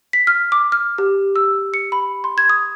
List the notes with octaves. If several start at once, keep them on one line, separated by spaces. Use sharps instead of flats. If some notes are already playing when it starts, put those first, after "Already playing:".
B6
F6
D6
F6
G4
E6
C#7
B5
C6
G#6
D#6